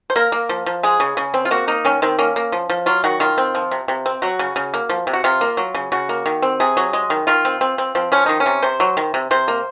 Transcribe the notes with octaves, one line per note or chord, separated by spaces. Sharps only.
C5
A#3 A#4
A#3
F3
F3
G#3 G#4
C#3
C#3
C4
F4
A#3 F#4
A#3 D#4
D#3 C#4
D#3 C4
A#3 C#4
A#3
F3
F3
F#3 F4
D#3 F#4
D#3 F4
C4
F3
C3
C3
C4
F#3 F#4
C#3
C#3
A#3
F3
C3
F#4
C3 F4
A#3
F#3
C#3
C#3 F#4
A#3
D#3
C4
C3 G#4
F#3
G#3
D#3
D#3 F4
C4
C4
C4
F3 C4
F3 C#4
D#3 D#4
C#4
C3
C3 C5
F#3
D#3
C3
C3 C5
A#3